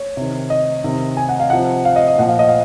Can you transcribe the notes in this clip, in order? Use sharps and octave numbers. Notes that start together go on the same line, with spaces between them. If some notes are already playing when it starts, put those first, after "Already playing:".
Already playing: C#5
C3 D#3
D#5
C3 D#3
G#5
F#5
F5
C3 F3 F#5
F5
D#5
D#5
A#2 F3 F#5
F5
D#5
F5